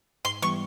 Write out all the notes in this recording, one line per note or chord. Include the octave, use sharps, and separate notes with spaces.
G#2 C6
E3 G3 B3 C#6